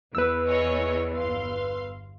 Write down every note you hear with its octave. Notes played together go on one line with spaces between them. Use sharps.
E2 B4 E6
G#4 C#5 D#5
G1 F5 C6